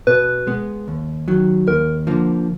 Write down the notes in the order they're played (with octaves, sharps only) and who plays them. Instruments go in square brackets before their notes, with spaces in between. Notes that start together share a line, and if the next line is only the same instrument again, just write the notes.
[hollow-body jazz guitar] B2 [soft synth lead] B4
[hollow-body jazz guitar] G#3 B3
D#2
D#3 F#3
[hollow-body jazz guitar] D#2 [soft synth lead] A#4
[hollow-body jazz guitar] D3 F3 A#3